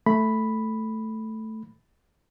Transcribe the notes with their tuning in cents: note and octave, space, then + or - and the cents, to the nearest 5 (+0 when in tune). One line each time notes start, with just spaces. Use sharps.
A3 +0 B5 +0